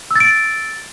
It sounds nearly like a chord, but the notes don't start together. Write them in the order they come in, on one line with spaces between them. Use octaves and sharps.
E6 A6 D7